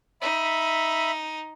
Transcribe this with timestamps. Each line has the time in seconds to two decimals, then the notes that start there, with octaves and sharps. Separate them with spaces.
0.22 D#4 E5 B5